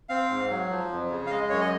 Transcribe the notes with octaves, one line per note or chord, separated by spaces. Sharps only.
C4 F5
G#2
F#3
F3
F2
C#3
F5
G#3 D#5
F#2 C#5
D#5